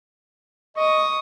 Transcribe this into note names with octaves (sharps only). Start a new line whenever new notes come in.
D#5 C#6 D#6